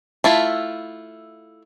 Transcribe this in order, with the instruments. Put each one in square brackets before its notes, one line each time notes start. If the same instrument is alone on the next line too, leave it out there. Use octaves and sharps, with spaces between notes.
[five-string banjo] A3 E4 F4